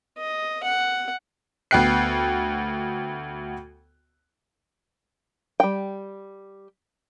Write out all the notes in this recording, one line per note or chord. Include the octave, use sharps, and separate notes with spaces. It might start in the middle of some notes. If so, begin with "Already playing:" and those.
D#5
F#5
D2 B3 G5 F#6 C7
G3 G5